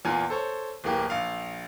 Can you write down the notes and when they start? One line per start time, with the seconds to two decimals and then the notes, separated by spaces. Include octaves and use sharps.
0.05 E2 A#2 F4 G#5
0.30 A4 C5 C#5
0.84 D1 E3 A#3 G4
1.10 A#1 F5